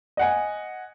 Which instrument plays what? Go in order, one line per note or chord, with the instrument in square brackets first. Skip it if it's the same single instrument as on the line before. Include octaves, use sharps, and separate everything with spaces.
[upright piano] D#5 F#5 G#5